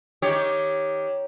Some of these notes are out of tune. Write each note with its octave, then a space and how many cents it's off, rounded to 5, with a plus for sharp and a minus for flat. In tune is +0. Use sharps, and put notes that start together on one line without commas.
D#3 +10 G4 +0 C#5 +0